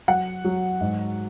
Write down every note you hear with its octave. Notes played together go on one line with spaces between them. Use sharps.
F#3 F#5
F#3
G#2